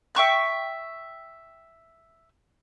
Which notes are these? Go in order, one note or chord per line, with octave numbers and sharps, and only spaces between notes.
E5 G5 C#6 F#6